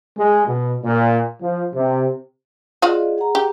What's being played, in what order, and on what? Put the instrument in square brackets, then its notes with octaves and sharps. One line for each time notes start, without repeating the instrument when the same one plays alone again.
[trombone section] G#3
B2
A#2
F3
C3
[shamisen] F4 F#4 F5 [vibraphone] G#4 D5 D#5
[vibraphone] G#4 F#5 A#5
[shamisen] G4